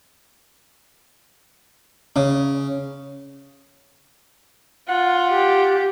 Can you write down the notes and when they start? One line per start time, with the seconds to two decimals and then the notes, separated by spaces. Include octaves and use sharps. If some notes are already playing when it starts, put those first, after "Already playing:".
2.16 C#3 C#4
4.89 F4 F#5
5.30 G4